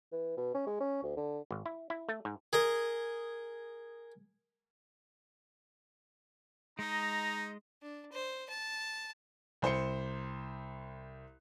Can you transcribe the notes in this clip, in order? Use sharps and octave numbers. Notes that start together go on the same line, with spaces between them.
E3
B2
C#4
G#3
C#4
D2
D3
G#1
E4
E4
A3
G#2
G#4 A#4 D#5
G#3 D#4 D#5 A#5
D4
C5
A5
C2 C5 C6 C#7